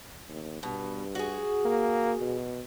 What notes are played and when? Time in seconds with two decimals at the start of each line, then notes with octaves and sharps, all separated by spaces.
0.29 D#2
0.63 G2 B2
1.15 F#4 G#4
1.65 A#3
2.21 B2